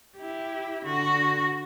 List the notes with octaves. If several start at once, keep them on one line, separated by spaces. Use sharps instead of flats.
E4 G4
D3 F#4